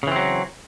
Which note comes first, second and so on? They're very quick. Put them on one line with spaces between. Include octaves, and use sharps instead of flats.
C#3 E3 C4 F#3